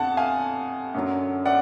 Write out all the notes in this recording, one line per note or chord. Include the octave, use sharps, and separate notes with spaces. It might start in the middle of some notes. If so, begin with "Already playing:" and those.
Already playing: F2 D3 F#5 A5
F5 G#5
F#2 D3 F#3
D5 F#5